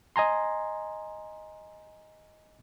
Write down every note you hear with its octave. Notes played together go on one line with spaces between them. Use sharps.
D#5 G#5 A#5 C6